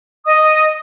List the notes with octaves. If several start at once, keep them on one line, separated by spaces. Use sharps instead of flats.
D#5 D#6